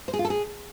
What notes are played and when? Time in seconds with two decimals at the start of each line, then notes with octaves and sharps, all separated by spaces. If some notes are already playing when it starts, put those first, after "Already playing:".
0.08 C5
0.13 G#4
0.19 F4
0.25 A4
0.30 G#4